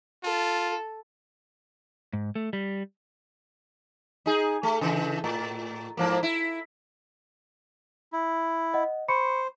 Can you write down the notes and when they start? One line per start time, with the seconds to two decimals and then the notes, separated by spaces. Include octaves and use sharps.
0.24 F4 A4
2.13 G#2
2.35 A3
2.53 G3
4.26 D#4 G#4
4.63 A3
4.81 C#3 E3
5.24 A2
5.97 G#2 F3 A#3
6.23 E4
8.12 E4
8.74 D#5 F#5
9.08 C5 B5 C#6 C#7